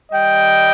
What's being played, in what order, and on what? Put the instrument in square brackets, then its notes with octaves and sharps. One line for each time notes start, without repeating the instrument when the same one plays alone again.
[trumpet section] G3 D#5 G5